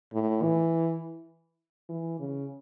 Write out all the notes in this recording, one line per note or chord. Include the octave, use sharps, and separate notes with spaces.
A2
E3
E3
C#3